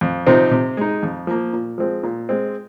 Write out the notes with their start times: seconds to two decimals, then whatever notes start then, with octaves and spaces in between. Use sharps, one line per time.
0.01 F2
0.27 C3 F3 C4 D#4
0.51 C3
0.77 G#3 D#4
1.03 F2
1.27 F3 A#3
1.53 A#2
1.78 F3 G#3 C4
2.03 A#2
2.29 G#3 C4